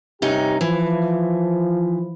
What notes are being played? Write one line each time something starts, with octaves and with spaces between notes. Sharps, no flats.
G2 C3 C#4 D#4 G4
E3 F3